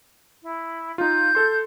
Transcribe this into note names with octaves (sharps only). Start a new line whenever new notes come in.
E4
D#4 F4 G6
A4 C6